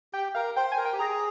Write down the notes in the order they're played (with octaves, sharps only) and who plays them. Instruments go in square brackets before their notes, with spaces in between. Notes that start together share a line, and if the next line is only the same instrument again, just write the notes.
[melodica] G4 [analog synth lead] G5
[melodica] A#4 [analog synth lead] F5
[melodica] C5 [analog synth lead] G5
[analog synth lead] G#5
[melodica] A#4
[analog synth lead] G5
[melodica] G4
[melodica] G#4 [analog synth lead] A#5